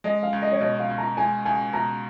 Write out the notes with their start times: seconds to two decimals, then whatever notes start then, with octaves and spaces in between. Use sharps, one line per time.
0.04 G#3 D#5
0.23 F5
0.33 C#2
0.42 D#5
0.52 C#5
0.61 B2 D#5
0.79 F5
0.90 C#2
0.98 A#5
1.17 G#3 G#5
1.45 C#2 G#5
1.73 B2 A#5